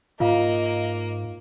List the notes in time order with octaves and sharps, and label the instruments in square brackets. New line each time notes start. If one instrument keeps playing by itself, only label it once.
[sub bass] G#2 [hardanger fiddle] A#3 [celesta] F4 F5 [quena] D#5